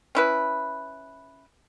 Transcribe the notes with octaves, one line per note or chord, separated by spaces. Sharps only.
C#4 E4 B4